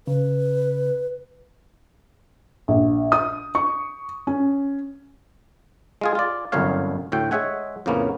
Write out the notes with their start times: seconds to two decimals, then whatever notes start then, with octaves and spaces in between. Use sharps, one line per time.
0.07 C#3 B4
2.68 A#1
3.12 D#6
3.55 C#6
4.27 C#4
6.01 G#3 F4 G#4
6.15 F4 D5
6.52 G1 C2 F#2 D3 C#5 F5
7.12 D2 A2 F#4 G5
7.31 G#3 G#4 C#5 E5 F#5 G#5
7.86 F2 A2 C#3 A#3 B3 C#4